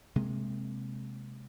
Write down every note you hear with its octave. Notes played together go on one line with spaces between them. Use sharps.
C3 G#3 A#3